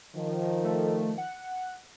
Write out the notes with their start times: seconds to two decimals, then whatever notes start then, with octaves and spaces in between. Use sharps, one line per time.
0.16 D#3 F3
0.64 A3
1.18 F#5